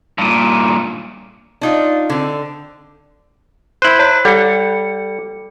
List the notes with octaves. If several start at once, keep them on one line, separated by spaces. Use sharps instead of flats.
G2 A#2
D4 D#4 F4
D3 C4
E4 C5 F#6 F#7
C#5 F#6 G6
G3 A4 C#7